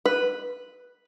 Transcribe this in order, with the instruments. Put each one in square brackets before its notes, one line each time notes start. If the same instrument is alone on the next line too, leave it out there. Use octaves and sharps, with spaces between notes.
[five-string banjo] B4